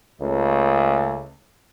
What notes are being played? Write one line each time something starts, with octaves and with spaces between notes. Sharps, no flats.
C#2 A3